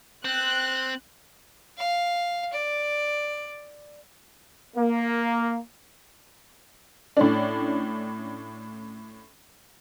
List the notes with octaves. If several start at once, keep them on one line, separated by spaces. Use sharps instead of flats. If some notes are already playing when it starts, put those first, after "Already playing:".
C4 F#6
F5
D5
A#3
A2 C#4 D4